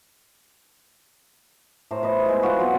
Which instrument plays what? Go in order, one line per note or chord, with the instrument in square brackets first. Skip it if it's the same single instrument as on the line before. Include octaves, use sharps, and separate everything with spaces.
[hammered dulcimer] A2 A3 A#4 C5
B4 C5 D#5
G#3 E4
F4 F#4
F#3 B3 C4